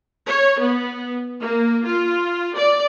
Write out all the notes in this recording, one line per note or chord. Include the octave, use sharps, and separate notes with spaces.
C#5
B3
A#3
F4
D5